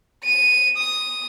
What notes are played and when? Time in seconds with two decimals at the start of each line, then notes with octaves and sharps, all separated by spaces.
0.24 D#7
0.77 D#6